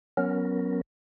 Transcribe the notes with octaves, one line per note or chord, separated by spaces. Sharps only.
F#3 B3 C#4 A#4